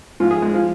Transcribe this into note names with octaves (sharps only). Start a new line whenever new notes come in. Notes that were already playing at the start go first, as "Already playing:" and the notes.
G#2 F3 F4
G#4
G#3
F3